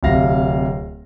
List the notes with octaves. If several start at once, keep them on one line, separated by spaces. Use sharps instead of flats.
D1 C3 E5 F5 A#6